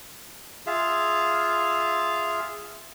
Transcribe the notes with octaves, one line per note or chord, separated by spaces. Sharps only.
F4 G#4 E5 F5